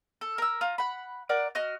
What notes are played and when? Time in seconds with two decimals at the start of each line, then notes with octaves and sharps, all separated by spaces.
0.21 A4
0.38 A#4 E6
0.61 F4 A#5
0.78 F#5 B5
1.29 A#4 D5 F#5
1.55 F#4 D#5 F6